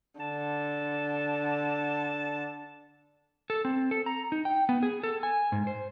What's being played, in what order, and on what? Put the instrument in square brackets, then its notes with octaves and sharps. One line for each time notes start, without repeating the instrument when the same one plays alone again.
[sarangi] D3 [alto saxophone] A5
[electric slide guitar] A4
C4
A4
A#5
D#4
G5
B3
G#4
A4
G#5
G#2
C5